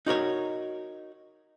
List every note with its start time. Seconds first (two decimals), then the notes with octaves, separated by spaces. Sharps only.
0.06 D#4 F#4 A#4 C#5